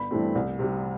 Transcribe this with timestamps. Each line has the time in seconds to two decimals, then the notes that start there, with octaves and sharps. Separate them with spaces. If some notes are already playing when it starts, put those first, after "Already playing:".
Already playing: G1 B5
0.11 G2 E3 A3 C4
0.35 C2
0.59 C3 G3